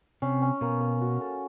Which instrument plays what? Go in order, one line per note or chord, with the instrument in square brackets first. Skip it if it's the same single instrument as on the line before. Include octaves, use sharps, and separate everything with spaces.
[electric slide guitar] C3 [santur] C#4
[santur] C#4
[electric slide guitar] B2 [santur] A#3
[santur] A#3
F#4
A4